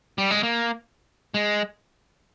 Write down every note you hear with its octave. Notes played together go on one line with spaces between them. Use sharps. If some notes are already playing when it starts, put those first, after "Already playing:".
G3
G#3
A#3
G#3